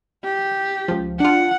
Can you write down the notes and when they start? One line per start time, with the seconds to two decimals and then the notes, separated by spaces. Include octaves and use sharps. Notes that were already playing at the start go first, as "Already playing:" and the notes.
0.24 G4
0.88 C#2 F3
1.20 D4 F4 F#5